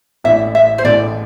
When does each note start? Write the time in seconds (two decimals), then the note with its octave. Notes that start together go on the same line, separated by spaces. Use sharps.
0.24 A1 A2 E3 A3 D4 E5
0.55 E5
0.78 C5
0.84 A1 A2 E3 A3 D4 D5